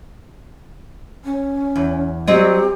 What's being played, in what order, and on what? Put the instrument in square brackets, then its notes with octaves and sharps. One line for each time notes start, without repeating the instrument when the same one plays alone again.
[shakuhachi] C#4
[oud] E2
[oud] F#3 C4 D#5 [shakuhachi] G4